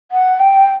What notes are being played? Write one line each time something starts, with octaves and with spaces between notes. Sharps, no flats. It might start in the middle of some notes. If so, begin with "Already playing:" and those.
F#5
G5